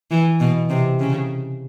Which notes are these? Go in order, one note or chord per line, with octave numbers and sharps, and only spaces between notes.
E3
B2
C3
C#3